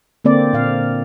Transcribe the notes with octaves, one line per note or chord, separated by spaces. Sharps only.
D3 A#3 C4 D5
A#2 F5